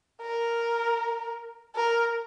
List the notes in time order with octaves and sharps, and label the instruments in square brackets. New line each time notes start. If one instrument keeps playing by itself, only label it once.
[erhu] A#4
A#4